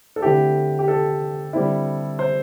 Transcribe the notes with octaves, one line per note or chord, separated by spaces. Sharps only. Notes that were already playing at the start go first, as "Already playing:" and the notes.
A4
D3 A3 C4 E4 G4
G4
A4
D3 G3 C4 E4
C5